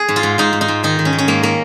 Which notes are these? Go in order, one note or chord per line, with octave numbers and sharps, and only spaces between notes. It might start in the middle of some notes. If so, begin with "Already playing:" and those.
Already playing: G#4
G#2
F4
G#2
G#2 D#4
G#2
D#4
G#2
D#3 D#4
D#3
C#4
D#3
C#4
G#2 A#3
D#3 A#3